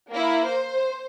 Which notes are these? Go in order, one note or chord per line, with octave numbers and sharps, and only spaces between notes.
A#3 E4
C5